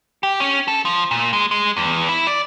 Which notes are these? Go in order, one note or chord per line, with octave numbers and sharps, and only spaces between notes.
G4
C#4
A4
F3
A#2
G#3
G#3
E2
E4
D5